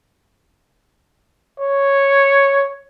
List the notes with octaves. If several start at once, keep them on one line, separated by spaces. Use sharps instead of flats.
C#5